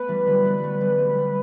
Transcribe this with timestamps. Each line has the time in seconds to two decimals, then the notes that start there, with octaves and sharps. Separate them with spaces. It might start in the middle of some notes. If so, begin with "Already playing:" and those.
Already playing: A3 B3 B4
0.08 E3 G3
0.27 D3 F#3
0.45 G3 B3
0.58 B3
0.63 F#3 A3
0.81 G3 B3
0.98 A3 C4
1.17 G3 B3